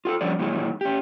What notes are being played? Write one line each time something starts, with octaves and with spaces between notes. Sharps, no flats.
F4 G#4 A4
F3 G3 C#4 D4 D5
A#2 D#3 E3 F#3 G#3
C#4 G4